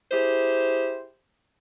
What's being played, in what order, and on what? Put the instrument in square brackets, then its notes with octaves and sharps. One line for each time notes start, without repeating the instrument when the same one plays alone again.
[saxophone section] E4 G4 G#4 C5